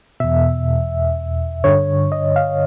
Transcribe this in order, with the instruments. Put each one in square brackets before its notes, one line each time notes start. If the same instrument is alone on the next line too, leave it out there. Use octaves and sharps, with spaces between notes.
[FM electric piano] E2 B2 E5
G2 D3 C#5
D#5
F5